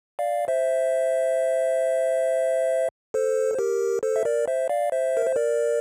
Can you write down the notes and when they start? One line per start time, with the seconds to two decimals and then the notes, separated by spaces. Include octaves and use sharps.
0.19 D5 F5
0.48 C5 E5
3.14 A4 C5
3.54 C5
3.59 G4 A#4
4.03 A4 C5
4.16 E5
4.25 A#4 D5
4.48 C5 E5
4.69 D5 F5
4.92 C5 E5
5.17 A#4
5.26 C5
5.36 A#4 D5